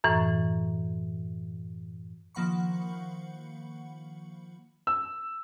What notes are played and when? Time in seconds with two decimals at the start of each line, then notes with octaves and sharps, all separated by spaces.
0.04 F#2 A2 E3
2.35 D#3 F3 A#3 F#5 B5 C#6
4.87 E6